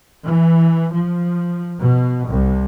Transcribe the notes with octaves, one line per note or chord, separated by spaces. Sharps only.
E3
F3
B2
C2